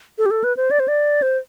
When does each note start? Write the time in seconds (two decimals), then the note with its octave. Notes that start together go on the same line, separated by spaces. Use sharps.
0.18 A4
0.26 G4
0.31 A4
0.44 B4
0.57 C5
0.71 D5
0.80 C5
0.88 D5
1.22 C5